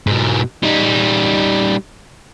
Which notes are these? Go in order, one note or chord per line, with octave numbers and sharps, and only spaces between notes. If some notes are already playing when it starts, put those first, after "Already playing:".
G#2 B2
G3 D#4